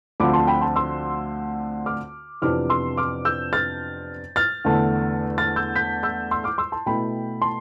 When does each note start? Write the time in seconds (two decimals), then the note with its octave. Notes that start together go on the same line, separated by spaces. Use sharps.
0.20 D2 D3 F3 C4 F4 B5 D6
0.33 A5 C6
0.47 G5 B5
0.61 A5 C6
0.76 C6 E6
1.86 D6 F6
2.42 F2 C3 E3 B3 D4 D6 F6
2.70 C6 E6
2.97 D6 F6
3.25 E6 G6
3.53 F6 A6
4.36 F6 A6
4.64 E2 D3 A3
5.38 F6 A6
5.56 E6 G6
5.76 G6 B6
6.03 E6 G6
6.31 C6 E6
6.44 D6 F6
6.58 C6 E6
6.72 A5 C6
6.86 B2 A3 E4 G5 B5
7.42 A5 C6